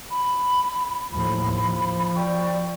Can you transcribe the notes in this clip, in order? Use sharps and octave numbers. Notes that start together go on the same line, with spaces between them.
B5
D#2 A2 F3 B5
F3
D5 G5 C#6